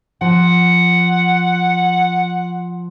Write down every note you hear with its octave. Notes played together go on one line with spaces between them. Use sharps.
F3 F#5